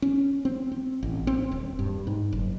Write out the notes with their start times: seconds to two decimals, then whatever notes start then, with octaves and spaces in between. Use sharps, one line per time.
0.02 C#4
0.45 C4
0.72 C4
1.03 A1
1.27 C4
1.51 D#1
1.79 G2
2.07 G#2
2.32 F#1